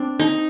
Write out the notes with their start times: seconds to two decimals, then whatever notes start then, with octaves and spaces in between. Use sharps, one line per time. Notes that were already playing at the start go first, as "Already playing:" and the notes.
Already playing: C4 D4
0.20 D#4